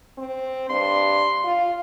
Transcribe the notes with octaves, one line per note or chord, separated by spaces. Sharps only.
C4
G2 C6
F4